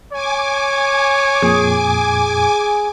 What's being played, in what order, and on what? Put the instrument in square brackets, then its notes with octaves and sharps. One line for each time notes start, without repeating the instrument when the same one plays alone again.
[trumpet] C#5 [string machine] G#5 D6
[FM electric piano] F2 A#2 [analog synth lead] G#4